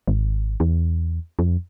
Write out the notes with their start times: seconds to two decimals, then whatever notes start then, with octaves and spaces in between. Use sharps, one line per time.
0.07 G#1
0.60 E2
1.39 F2